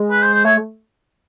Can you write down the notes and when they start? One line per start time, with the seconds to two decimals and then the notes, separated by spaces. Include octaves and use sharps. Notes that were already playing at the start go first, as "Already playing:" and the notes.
Already playing: G#3
0.11 B4
0.22 C5
0.34 C5
0.45 A3 C#5